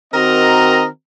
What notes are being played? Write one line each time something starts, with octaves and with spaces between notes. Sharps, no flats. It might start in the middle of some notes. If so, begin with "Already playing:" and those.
D#3 C4 F#4 A#4 D#5 A#5